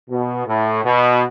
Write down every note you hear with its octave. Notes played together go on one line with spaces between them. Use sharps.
B2
A2
B2